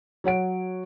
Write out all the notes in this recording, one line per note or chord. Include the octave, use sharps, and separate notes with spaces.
F#3 C#5 F#5 D7